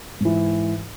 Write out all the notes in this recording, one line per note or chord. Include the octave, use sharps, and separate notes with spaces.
G#2 E3